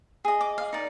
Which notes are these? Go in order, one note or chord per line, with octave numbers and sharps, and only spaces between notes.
G#4 D#5
D6
F5
D#4 A#4 D5